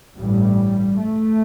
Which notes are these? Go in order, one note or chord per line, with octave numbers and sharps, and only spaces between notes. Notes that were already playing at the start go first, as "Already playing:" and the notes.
A1 G2 G3
A3